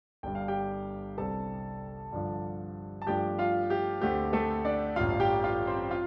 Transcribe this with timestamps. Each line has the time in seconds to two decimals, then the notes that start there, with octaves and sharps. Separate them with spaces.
0.23 G1 G2 G3 D4 G5
0.35 F5
0.48 G4 G5
1.17 C2 C3 G3 C4 A4 A5
2.12 G2 D3 F3 D4
3.02 A5
3.07 G2 F3 A3 D4 G4 G5
3.39 F4 F5
3.70 G4
4.01 D2 D3 A3 C4 G4
4.33 A3 A4
4.65 D4 D5
4.96 A1 G2 G3 F4 F5
5.10 F5
5.20 G4 G5
5.44 F4 F5
5.67 C4 C5
5.91 F4 F5